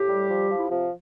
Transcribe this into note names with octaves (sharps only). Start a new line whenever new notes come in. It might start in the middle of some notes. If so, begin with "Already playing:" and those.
Already playing: A2 G4
G3
F3
F3
E4
C3 F3 F4